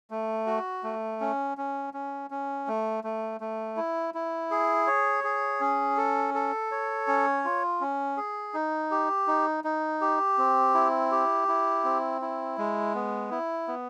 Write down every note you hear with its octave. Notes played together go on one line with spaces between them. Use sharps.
A3
F#4
A3
C#4
C#4
C#4
C#4
A3
A3
A3
E4
E4
G#4
C#5
G#4
C#4
A4
A4
C#5
C#4
F4
C#4
G#4
D#4
G4
D#4
D#4
G4
C4
E4
G4
E4
C4
E4
G#3
B3
E4
B3